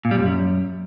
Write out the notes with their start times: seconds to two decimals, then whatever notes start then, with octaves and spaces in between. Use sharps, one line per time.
0.05 A#2
0.11 G3
0.18 F#2